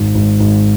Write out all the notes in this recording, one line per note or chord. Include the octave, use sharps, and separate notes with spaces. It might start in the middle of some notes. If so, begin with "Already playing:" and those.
Already playing: G#1
G#1
G#1